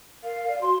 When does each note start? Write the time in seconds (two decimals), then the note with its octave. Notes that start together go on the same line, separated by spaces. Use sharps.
0.23 A#4 F5
0.48 D5
0.62 F#4 C6